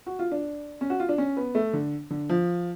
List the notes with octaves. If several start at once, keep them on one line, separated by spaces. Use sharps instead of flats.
F#4
F4
D4
C#4
F#4
F4
D4
C#4
B3
A3
D3
D3
F3